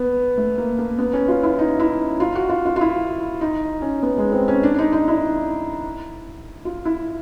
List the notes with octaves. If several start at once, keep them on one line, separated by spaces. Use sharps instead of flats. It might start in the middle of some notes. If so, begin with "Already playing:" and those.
Already playing: B3
A3
A#3
A#3
B3
C#4
F4
E4
D#4
E4
F4
F#4
F4
F4
F4
E4
D#4
C#4
B3
G#3
C4
C#4
D4
D4
D#4
D#4
E4
F4
E4